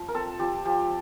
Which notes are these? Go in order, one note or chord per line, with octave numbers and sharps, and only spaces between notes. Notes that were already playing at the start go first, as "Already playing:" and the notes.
Already playing: F3
A#4
C4 A4
F3 G4
F3 G4